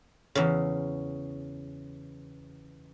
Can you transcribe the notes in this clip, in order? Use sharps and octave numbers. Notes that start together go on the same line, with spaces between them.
E2 C#3